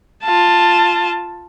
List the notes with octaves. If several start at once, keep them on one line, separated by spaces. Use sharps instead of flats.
F4 A5